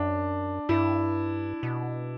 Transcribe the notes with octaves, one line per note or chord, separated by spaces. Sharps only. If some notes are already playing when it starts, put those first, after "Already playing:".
Already playing: F#2 D4
G2 E4
B2